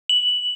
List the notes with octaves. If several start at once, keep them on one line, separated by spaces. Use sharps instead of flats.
F#7